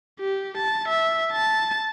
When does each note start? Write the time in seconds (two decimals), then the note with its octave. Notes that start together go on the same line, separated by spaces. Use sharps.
0.20 G4
0.57 A5
0.89 E5
1.32 A5